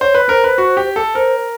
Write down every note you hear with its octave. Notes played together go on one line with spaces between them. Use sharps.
C5 C#5
B4
A#4 C5
B4
F#4
G4
A4
A#4 C5